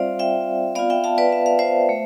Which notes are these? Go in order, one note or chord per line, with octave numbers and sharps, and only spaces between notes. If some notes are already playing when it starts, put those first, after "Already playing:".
Already playing: G3 C4 F4 C5 D5 E5 F5
E5 G5
B3 F4 D5 F5
E5 G5
F5 A5
B4 D5
E5
F5
C5 E5
A3